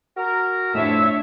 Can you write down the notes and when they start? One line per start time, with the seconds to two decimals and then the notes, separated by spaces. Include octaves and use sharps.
0.17 F#4 A#4
0.75 F2 A2 D4 C#5 E5 E6